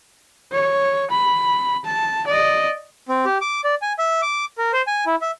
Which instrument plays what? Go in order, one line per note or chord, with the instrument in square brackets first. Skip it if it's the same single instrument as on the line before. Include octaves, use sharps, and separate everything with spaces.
[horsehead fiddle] C#5
B5
A5
D5 D#5
[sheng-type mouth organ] C4
G4
D6
D5
G#5
E5
D6
A#4
C5
G#5
E4
E5